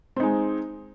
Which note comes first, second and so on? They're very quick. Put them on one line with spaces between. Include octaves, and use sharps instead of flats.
C4 D#4 G#3